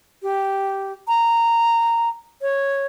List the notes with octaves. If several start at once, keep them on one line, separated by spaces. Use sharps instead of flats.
G4
A#5
C#5